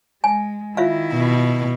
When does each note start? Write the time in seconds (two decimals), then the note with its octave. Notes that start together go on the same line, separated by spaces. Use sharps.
0.24 G#3 G#5
0.77 D#3 E4 F4 E5 F5
1.13 B2